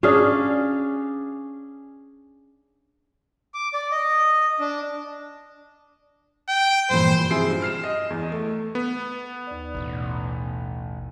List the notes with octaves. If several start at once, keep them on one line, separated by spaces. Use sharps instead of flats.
C#4 D4 G#4 F5
D6
D5
D#5
D4
G5
G2 A#2 E3 C5
C3 F3 E4 G#4 C7 D7
G2
F6 C7 E7
D#5
E2
A3
B3
D#2 D5
A1 B2